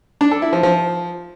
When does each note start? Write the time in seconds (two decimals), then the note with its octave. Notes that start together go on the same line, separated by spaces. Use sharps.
0.21 D4
0.31 A4
0.42 E4
0.53 F3
0.63 F3